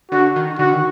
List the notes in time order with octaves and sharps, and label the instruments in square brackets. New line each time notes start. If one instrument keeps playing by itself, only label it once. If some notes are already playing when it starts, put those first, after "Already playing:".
[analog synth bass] D3 [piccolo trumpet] F#4
[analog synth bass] D#3
[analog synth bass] D3 [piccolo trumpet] F#4
[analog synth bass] D#3